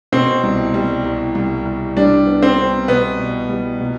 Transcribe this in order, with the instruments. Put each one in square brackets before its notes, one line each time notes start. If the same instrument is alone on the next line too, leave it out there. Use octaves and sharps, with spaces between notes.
[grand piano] B2 [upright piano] C4
[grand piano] C2
G3
C2
C2
C2
[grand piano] G3 [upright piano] D4
[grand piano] B3
[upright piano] C4
[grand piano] B3
[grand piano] B2 [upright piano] B3
[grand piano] B2
G3
B2